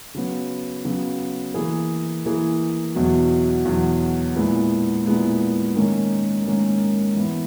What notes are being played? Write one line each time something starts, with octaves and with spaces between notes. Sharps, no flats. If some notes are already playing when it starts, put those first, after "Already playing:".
C#3 F#3 B3
C#3 F#3 B3
E3 A#3 E4 G#4
E3 A#3 E4 G#4
E2 B2 F#3
E2 B2 F#3
A#2 G#3 B3 E4
A#2 G#3 B3 E4
G#2 D#3 A#3 C#4
G#2 D#3 A#3 C#4
E3 B3 E4